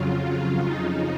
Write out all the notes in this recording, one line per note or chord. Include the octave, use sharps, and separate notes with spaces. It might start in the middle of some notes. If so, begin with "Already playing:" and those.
Already playing: F2 C#3 F#3 F4
F4
F2 C#3 F3 D#4